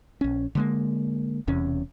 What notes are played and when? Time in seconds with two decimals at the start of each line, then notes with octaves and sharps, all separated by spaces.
0.21 A#1 C#4
0.55 D3 G#3 A#3
1.48 E1 E2 C3 C#4